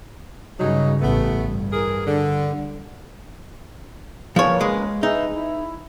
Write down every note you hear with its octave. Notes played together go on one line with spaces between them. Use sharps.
G2 C#3 F#3 D#4
A1 A3 B3
G2
E3 G#4 A#4
D3
F3 A#3 C#4 B4 C#5
G#3
D#4 G#4 B4 E5
E4